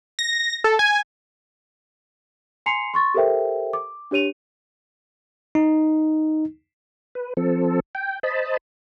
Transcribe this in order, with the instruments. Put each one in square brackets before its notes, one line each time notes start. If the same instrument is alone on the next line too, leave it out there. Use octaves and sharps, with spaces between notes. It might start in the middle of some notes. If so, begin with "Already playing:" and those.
[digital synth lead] A#6
A4
G#5
[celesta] G#5 A#5 C6 C7 C#7 F7
C6 C#6 A6
G4 A4 A#4 C5 E5 G5
D6
D4 G4 C#5 D#7 F7
[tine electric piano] D#4
[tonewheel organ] B4
F3 C4 A4
G5
C5 D#5 A5 B5